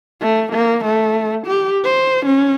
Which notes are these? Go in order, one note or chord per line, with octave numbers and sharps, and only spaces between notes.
A3
A#3
A3
G4
C5
C#4